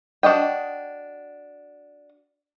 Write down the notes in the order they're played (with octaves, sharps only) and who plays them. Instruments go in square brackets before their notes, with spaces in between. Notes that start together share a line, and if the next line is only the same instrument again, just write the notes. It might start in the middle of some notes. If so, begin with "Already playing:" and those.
[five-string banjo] D4 F#4 D#5 G5